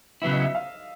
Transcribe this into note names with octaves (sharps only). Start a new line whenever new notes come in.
C#3 F#3 B3 E4 E5
D#5
E5
F5